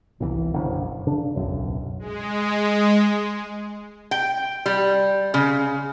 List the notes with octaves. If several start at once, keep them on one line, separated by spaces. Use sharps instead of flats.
G1 C2 B2 E3
F#1 B1 F#2 D3
C#3 D4
D1 B1 F#2
G#3
G5
G3
C#3